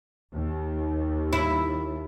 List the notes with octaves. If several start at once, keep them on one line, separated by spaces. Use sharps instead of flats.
D#2
E4